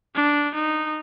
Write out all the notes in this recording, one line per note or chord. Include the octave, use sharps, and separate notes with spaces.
D4
D#4